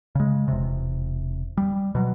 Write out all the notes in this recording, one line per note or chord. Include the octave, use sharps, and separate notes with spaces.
C#3 G#3
E1 C3
G3
B2 F#3